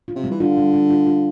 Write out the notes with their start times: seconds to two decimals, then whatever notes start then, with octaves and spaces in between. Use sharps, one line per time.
0.08 F4
0.16 C3
0.24 G3
0.31 E3
0.40 D3 F4
0.57 G3
0.74 G3
0.90 F4
1.07 F4